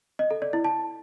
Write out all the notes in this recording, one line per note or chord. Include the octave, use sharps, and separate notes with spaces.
D#5
A4
D5
E4
A5